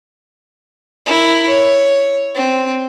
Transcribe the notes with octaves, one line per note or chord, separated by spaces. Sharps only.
E4 A#4
C#5
C4